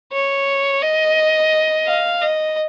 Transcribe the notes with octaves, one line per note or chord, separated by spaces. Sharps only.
C#5
D#5
F5
D#5